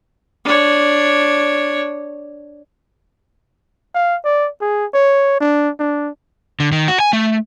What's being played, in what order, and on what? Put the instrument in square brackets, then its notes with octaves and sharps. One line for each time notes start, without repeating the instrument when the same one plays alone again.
[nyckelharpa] D4 C#5
[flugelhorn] F5
D5
G#4
C#5
D4
D4
[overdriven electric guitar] D3
D#3
F#4
G#5
A3